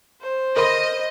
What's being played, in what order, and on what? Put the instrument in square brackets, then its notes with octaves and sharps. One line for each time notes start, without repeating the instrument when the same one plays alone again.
[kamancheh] C5
[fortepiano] A#4 B5 C6 [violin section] D#5